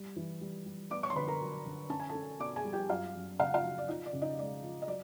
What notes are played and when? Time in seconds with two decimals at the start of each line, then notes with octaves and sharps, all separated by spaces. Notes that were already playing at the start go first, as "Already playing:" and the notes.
Already playing: G3
0.16 E3
0.41 G3
0.66 G3
0.91 B3 D5 D6
1.03 C#5 C#6
1.10 C6
1.15 D3 B4 B5
1.27 A#4 A#5
1.40 F#3
1.65 D3
1.90 C#4 A5
2.00 G#5
2.09 A4 A5
2.15 C#4
2.39 B2 D5 D6
2.56 G#4 G#5
2.65 G3
2.73 G4 G5
2.89 F#2 F4 F5
3.15 F#2
3.39 C#3 F5
3.47 F#5
3.54 F4 F5
3.63 F#3
3.78 D5
3.88 F3 D#4 D#5
4.06 D5
4.13 C#3
4.22 D#4 D#5
4.38 G#3 D5
4.63 F3
4.82 D#5
4.88 F#3 D5